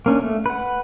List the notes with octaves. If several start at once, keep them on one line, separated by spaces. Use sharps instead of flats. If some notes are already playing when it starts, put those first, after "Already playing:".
A#3 C#4 D4
A3
B4 F#5